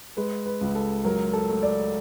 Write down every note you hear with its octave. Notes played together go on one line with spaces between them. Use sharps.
G#3 B4
B4
C#2
A4
F#3 A#4
A4
A3
D5